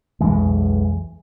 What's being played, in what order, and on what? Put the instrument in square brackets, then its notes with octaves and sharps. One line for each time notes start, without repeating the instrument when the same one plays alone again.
[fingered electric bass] B1 F2 E3 G#3